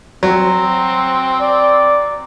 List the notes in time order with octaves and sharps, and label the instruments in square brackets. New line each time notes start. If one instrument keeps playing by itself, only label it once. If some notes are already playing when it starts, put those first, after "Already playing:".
[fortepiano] F#3 [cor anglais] C4
[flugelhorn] D5